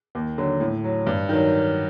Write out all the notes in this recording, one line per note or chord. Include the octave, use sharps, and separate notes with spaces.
D#2
D3 F#3
A2
F#3
G2
D#3 F#3